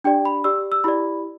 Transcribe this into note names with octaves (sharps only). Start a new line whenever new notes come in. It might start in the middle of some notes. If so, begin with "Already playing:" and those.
D4 G4 D5 G5
B5
G4 D5 E6
E6
E4 G4 D5 B5